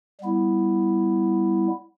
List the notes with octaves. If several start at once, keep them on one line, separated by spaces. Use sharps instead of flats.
G3 B3 E4